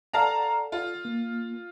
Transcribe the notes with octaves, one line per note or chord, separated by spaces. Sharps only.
A4 D5 F5 F#5 A5 A#5
F4
A#3